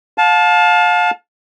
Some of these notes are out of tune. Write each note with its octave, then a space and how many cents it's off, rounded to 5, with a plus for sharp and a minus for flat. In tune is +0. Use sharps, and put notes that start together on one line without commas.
F5 +30 A5 -15